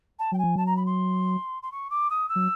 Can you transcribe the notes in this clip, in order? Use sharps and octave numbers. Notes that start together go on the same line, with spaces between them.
A5
F#3 G5
G#5
F3
F#3 A5
A#5
B5
C6
C6
C#6
D6
D#6
E6
F#3